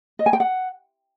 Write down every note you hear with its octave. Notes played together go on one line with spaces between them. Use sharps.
D#5
G#5
G5
F#5